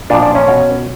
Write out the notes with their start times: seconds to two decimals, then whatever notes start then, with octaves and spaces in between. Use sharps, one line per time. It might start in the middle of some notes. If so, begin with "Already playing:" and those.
0.10 A#2 F3 D4
0.23 D4
0.35 C#4
0.48 B2